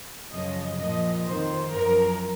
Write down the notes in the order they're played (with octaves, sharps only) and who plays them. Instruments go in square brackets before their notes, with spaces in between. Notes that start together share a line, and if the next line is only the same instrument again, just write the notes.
[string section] F#2 C#3 F3 D#5
A#2 F3 D#5
F2 D#3 C5
F#2 F3 A#4